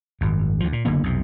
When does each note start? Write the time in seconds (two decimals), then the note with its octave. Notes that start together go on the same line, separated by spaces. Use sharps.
0.21 G#1 F#2
0.60 D2 F3
0.73 A#2
0.85 F#1 D3 A#3 B3
1.04 B1 F2 C3